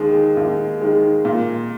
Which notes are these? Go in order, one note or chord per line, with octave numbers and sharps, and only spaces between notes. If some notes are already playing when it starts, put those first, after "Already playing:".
Already playing: D#2 D#3 G#3
D#2
D#3 G#3
A#2